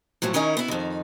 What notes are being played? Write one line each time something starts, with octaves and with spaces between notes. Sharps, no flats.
F#2 A2 F3 F#3
D#3 C#4 D#4 E4 A#4
B3 E4
F2 D#3